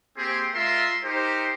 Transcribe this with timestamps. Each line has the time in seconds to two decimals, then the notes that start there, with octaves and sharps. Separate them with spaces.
0.17 A#3 C4 G4 G#4 C6
0.54 G#3 F4 A#4 E5 C6
1.03 D#4 G4 A#4 C5